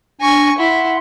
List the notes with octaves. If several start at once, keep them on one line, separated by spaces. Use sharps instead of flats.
D4 G#5 C#6 A#6
E4 F#5 C6